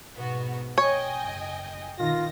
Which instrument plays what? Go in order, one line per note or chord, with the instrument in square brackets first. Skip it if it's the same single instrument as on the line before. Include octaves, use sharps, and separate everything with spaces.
[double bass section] G#2 B2 [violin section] B3 F#4
[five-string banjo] C#5 [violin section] D#5 G5 G#5
[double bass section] F#1
[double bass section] B2 D#3 [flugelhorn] F4 [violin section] A#6